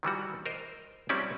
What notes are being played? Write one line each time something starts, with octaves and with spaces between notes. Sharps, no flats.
D#3 E3 G3 F#4
A#4 C5 D#5
F#3 G3 C4 C#4 E4 D5